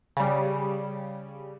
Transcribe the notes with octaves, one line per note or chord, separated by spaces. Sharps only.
C#3 G3